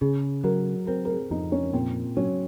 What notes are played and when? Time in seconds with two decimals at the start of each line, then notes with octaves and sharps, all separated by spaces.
0.01 C#3 G#4
0.44 F#3 A#4
0.87 C4 A#4
1.05 A#4
1.10 G#4
1.30 F2 D#4
1.52 C#4
1.73 A#2 C4
2.17 F#3 C#4